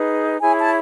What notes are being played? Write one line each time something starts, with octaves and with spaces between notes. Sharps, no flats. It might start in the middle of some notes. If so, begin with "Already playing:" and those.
Already playing: D#4 G#4 B4
E4 G#4 C#5 G#5
A5